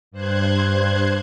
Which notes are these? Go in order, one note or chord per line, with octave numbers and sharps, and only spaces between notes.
G2 C5 F#6 G#6